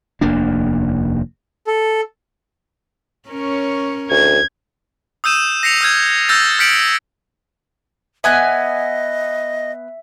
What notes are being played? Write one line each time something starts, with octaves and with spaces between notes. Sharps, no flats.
F1 D#2 A#3 D4
A4
C#4 A#4 C#5
D2 G#6
D#6 E6 G6 D#7 E7
A#6 C7 C#7 F7
D#6 F6 G6 G#6
E6 F6 G6 A6 A#6
F6 G6 B6 C#7 D7 F#7
B3 D#5 E5 G#5 F#6